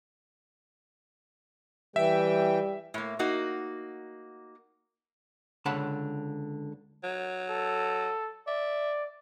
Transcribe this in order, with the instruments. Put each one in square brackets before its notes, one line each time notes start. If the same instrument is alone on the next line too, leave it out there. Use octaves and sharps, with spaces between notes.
[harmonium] E3 G5 [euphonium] G3 [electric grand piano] E5
[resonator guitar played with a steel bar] A2 A#3
A#3 D#4 F#4
[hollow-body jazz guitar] C#2 D3 C#5 F#5 A5 B5
[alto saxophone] F#3
[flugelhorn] A4
[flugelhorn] D5 [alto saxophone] E5